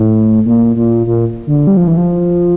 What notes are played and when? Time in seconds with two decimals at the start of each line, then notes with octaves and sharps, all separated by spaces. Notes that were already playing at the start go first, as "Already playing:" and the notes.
Already playing: A2
0.46 A#2
0.76 A#2
1.06 A#2
1.47 D3
1.67 G3
1.77 F3
1.87 E3
1.97 F3